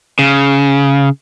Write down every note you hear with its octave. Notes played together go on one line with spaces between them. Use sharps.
C#3